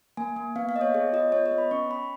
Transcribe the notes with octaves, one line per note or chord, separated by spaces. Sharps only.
A#3 G#5
A#3
B3 F5
F5
B3 D#5
C#5
G#4 C#5
F4 D#5
B3 C#5
D#5
B3
B5
C#4 C#6
C#4 B5